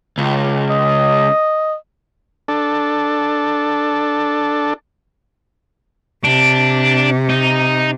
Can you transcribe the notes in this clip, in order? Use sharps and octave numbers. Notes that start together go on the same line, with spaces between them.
C#2
D#5
D4 A4
C3 D4
D#4